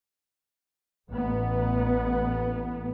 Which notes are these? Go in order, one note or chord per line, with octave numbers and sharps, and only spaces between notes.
A1 B3